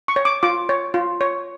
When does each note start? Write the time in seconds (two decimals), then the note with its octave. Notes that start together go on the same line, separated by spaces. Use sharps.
0.08 C#6
0.16 C#5
0.25 D6
0.43 F4 D6
0.69 C#5
0.94 F4
1.21 C#5